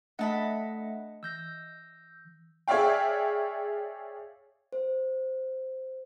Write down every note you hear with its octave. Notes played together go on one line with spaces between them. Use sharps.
A3 D4 D#5 F#5 A5 B5
E3 E6 G6 A#6
G#4 C#5 D5 E5 F5 G5
C5